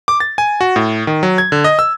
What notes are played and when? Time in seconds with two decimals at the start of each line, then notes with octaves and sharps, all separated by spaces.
0.08 D6
0.20 A6
0.38 G#5
0.61 F#4
0.76 A2
1.07 D#3
1.23 F#3
1.38 G#6
1.52 D3
1.64 D#5
1.79 E6